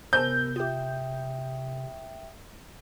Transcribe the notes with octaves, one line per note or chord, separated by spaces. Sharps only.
C3 B3 A#4 C5 G#5 A5 E6 G6
F4 G4 E5 G5 D#6